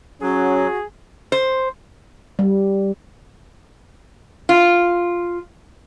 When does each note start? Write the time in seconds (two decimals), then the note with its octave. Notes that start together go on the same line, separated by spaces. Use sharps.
0.22 F#3 C#4 F#4 G#4
1.32 C5
2.39 G3
4.49 F4